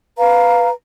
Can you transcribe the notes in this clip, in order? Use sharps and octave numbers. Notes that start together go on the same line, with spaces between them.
B4 F5 A#5